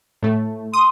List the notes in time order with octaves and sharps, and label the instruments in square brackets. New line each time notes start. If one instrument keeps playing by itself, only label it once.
[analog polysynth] A2 A3
[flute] C6 [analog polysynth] D#6